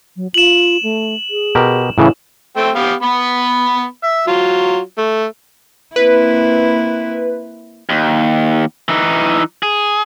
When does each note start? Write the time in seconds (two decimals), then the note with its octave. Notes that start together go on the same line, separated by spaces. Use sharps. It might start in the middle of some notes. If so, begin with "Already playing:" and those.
0.16 F#3
0.34 F4 E7 F#7
0.83 A3
1.30 G#4
1.55 B2 G4 A#4
1.98 A2 C#3 E3 E4
2.57 A3 C4 G5
2.75 B3 G4 F5
3.03 B3 B5
4.03 E5
4.27 F#3 F4
4.98 A3
5.96 A#3 C4 E4 B4
7.89 D#2
8.89 E3 D#4
9.63 G#4